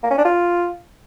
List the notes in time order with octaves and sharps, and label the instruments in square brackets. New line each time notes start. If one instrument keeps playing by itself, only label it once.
[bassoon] A#3
C#4
D4
F4